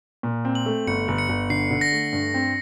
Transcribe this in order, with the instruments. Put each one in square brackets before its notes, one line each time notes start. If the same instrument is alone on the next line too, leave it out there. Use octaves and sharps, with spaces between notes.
[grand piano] A#2
C4
[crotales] F#7
[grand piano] A3
[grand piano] G1 [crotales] C#7
[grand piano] G1
[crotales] C#7
[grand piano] G1
[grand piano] D3 [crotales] C7
[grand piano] D3
[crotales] A#6
[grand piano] A3
G2
C4